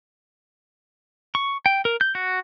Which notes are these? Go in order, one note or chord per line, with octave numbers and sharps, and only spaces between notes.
C#6
G5
A#4
G6
F#4